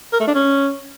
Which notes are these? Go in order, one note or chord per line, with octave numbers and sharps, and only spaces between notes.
A#4
A3
D4
C#4